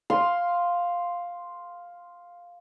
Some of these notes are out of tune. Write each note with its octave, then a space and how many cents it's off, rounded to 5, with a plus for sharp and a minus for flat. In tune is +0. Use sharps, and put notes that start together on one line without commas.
F5 +5 C6 +0